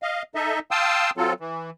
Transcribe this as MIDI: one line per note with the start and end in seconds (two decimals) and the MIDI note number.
0.02 0.22 75
0.02 0.22 77
0.35 0.59 63
0.35 0.59 69
0.35 0.59 75
0.35 0.59 76
0.71 1.10 77
0.71 1.10 79
0.71 1.10 81
0.71 1.10 84
0.71 1.10 87
0.71 1.10 88
1.17 1.33 54
1.17 1.33 60
1.17 1.33 65
1.17 1.33 69
1.40 1.70 52